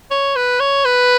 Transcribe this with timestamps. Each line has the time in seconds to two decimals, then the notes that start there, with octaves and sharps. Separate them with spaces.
0.11 C#5
0.36 B4
0.60 C#5
0.85 B4